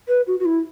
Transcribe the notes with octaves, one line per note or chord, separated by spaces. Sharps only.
B4
F#4
F#4
E4